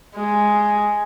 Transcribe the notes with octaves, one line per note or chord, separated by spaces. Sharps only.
G#3